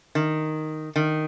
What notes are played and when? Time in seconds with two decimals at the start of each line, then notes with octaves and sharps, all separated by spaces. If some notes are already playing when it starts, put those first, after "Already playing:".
0.15 D#3
0.96 D#3